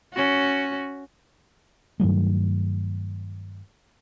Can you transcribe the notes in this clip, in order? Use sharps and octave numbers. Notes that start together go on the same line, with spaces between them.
C#4 F#4
G2 D#3 F#3 A3